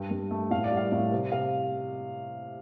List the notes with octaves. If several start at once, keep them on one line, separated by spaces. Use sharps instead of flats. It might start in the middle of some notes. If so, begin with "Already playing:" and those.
Already playing: G2 G5
G2
A3
A2 F5
D5
G3
F5
A2
C3
C3 F5